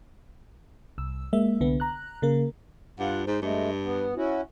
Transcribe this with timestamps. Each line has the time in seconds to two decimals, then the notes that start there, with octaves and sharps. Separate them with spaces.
0.98 C2 E6
1.33 G#3 A#3 E5
1.60 C2 D3 B3
1.80 A#5 F#6
2.22 C#3 A#3 A#4
3.00 G2 F4 F#5
3.27 G#2 C5
3.42 G2 G#3 A3
3.85 B3
4.16 C#4 E4 F#4